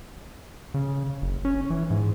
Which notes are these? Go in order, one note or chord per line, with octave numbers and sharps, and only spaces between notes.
C#3
F#1
C#4
E3
G#2